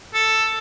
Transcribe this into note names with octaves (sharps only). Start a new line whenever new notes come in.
A4